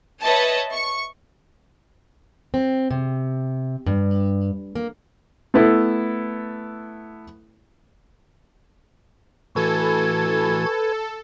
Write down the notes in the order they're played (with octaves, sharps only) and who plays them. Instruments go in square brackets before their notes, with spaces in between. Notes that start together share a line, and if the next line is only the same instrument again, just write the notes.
[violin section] B4 C#5 D#5 E5 A5
C#6
[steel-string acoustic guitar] C4
C3
G2
A#3
[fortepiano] A3 B3 E4 A4
[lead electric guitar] A2 E3 [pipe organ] F#4 G#6 [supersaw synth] A4 [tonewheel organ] B4 G#5